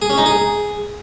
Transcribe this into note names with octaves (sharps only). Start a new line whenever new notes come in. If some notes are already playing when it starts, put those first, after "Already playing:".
G#4
C#4
D#4
G#4